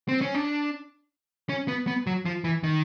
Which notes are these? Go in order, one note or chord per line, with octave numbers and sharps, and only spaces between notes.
C4
C#4
D4
C#4
B3
B3
F#3
F3
E3
D#3